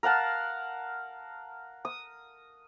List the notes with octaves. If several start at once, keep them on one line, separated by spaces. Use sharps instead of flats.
A#4 F5 F#5 A5
D#6